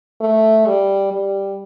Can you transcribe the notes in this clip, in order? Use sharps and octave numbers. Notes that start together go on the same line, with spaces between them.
A3
G3
G3